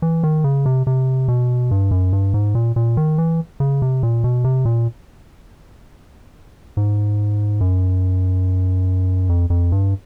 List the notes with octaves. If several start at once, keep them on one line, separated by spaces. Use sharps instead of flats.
E3
D#3
C#3
C3
C3
B2
G2
F#2
G2
G#2
A#2
A#2
D#3
E3
C#3
C3
A#2
B2
C3
A#2
G#2
F#2
F2
F2
G2